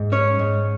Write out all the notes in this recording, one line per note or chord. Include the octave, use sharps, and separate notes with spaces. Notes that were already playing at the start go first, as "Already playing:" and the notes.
Already playing: G#2
C#4 C#5
G#2